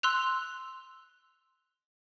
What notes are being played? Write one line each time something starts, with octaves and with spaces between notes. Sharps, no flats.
C6 E6 F#6 F7